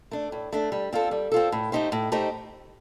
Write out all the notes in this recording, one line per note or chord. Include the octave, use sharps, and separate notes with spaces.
A3 D4
A2
A3 D4
G3
C4 F4 A4
G3
C4 F4 A4
A2
A3 D#4 G4 C5
A2
A3 D#4 G4 C5